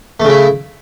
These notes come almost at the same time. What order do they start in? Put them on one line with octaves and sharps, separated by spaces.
A3 C#3 E4